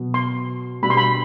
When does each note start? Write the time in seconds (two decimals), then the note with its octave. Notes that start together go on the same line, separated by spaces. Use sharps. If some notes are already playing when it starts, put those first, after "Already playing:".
Already playing: B2 F#3 B3
0.14 C6
0.82 B2 G3 B3 D4 F#4 B5
0.90 C6
0.97 B5